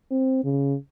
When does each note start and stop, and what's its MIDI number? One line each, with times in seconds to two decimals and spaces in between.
0.11 0.42 60
0.44 0.74 49